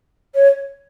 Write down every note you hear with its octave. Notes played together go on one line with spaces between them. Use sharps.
C#5